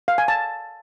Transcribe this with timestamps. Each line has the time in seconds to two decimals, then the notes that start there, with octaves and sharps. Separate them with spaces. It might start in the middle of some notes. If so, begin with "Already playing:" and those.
0.08 F5
0.18 G#5
0.28 A5